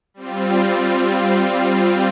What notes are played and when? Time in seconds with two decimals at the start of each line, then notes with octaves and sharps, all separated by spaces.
0.14 G3 C4 F4